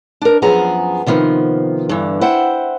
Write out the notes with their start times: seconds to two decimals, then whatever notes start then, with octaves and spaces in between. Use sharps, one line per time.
0.22 D4 A#4
0.42 F#2 F3 B3 G#4 A#5
1.06 C3 D#3 F3 B3
1.89 G2 D3 E3
2.21 E4 C5 F#5 G5